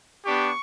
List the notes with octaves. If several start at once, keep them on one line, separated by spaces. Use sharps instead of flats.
B3 D4 G4 C#6